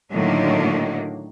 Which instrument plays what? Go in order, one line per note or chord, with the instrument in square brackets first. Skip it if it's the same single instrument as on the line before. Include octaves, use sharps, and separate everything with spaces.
[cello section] A2 D3 D#3 F#3 A#3